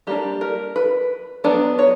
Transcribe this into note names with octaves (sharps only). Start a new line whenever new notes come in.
G3 A#3 D4 G4
A#4
B4
F#3 B3 D4 D5
C#5